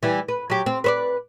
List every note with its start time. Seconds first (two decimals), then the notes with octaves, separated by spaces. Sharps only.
0.03 E3 G3
0.28 B4
0.50 F#3 G4
0.66 C4
0.84 B4 C5 D5